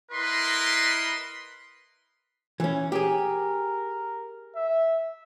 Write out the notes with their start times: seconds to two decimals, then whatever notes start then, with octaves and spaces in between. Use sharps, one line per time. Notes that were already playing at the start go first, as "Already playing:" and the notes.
0.12 E4 A#4 B4 D#5 B5 C6
2.60 E3 C#4
2.92 G4 G#4 A#4
4.56 E5